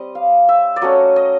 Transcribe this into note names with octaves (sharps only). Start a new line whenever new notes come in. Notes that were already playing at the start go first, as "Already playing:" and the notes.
Already playing: G3 C4 D#5
F5
E5
D5
F#3 A3 C#4 D#5
D#5